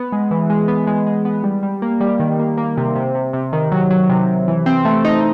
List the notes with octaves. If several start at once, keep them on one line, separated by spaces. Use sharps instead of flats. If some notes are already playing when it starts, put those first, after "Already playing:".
Already playing: B3
G#3
E3
G#3
B3
G#3
G#3
B3
G3
G3
A#3
G3
D#3
A#3
A#3
C3
C3
C3
C3
D#3
F#3
F#3
C3
C3
E3
C4
A3
D#4